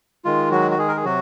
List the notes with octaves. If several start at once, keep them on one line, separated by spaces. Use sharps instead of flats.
D#3 G#3 F4
F#3 F#4
F#4
G#3 G#4
A#4
G#4
C3 F#3 F#4